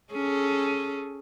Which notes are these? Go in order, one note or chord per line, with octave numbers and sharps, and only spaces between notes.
C#4 G#4 A4